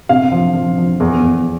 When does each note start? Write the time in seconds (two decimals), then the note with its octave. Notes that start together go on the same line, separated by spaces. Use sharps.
0.09 C3 F5
0.32 F3
0.55 F3
0.78 F3
1.00 E2
1.23 E2